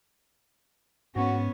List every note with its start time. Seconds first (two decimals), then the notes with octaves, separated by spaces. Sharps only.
1.16 G#2 B3 C#4 F#4